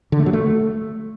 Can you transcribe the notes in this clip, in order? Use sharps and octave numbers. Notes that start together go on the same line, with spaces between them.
D3
A3
F#3
A3